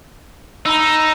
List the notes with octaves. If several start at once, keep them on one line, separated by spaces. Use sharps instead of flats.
D#4 A#5 B5 E6
E7